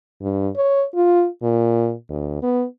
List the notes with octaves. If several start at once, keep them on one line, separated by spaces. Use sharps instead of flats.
G2
C#5
F4
A#2
D2
B3